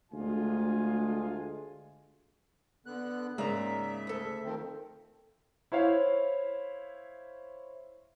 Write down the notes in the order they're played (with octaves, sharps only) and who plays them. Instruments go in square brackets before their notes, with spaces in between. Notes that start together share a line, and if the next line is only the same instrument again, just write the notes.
[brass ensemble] D2 G#3 A3 F4 G#5
[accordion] D3 B3 F#6
[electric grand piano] G#2 C#3 G#3 [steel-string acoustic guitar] A#3 D5 A#5 [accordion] E5
[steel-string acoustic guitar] D2 A4
[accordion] D#3 F3 C4
[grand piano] E4 C5 C#5 E5 F5